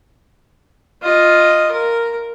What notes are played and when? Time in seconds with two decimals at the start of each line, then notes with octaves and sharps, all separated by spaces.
1.02 F4 D#5
1.72 A#4